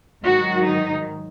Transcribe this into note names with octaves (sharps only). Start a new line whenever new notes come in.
G#2 D#3 F#3 F#4
D#4